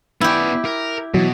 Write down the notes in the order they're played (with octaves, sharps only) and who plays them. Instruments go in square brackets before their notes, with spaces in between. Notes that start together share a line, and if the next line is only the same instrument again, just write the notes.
[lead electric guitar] B3 D5 [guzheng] E4 G4
[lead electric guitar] A#4
[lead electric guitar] B2 [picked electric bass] E3 F#3